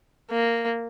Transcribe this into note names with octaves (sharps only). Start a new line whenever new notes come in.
A#3